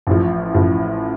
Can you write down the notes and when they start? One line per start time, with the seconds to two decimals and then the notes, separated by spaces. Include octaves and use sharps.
0.07 A1 A2 F3
0.54 A1 A2 F3